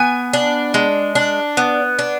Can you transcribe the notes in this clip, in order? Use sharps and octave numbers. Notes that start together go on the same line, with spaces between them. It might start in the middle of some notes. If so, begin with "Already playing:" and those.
Already playing: B3 G#5
D4
G#3
D4
B3
D4